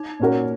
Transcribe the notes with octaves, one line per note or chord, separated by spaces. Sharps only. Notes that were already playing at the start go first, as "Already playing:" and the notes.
Already playing: D#4
A#2 A#3 C#4 F#4 A#4